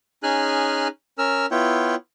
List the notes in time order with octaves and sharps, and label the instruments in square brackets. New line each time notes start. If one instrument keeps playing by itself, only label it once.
[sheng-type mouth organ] C#4 D#4 G#4 G#5 F6 F#6
C#4 A#4 E6 F6
B3 E4 F4 C#5 G5